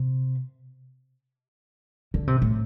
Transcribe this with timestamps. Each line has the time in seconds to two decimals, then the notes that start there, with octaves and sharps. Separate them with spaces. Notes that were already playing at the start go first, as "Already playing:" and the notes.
Already playing: C3
2.14 D3
2.27 C3
2.42 A2